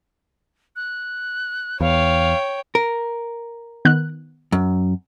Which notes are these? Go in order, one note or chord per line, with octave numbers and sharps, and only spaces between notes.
F#6
E2 C#5 F5 G5
A#4
D#3 B3 F#6
F#2